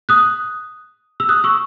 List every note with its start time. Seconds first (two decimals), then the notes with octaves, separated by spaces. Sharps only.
0.09 D#6 F#6
1.20 E6
1.29 D#6 F#6
1.44 C#6 E6